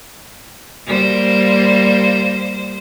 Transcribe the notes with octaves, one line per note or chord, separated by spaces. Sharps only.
G3 A#3 C5